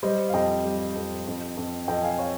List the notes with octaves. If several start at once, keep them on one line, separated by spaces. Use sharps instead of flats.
G3 C5 D#5
F5
F2 D#5 G5
G3
F2
F2
F2
F2 D#5 G5
F5 G#5
C#5 F5